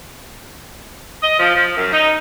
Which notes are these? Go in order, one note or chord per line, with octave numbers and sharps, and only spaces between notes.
D#5
F3
F3
F#2
D#4